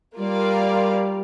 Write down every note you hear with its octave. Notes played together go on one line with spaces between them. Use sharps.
G3 A#3 F4 D5 F5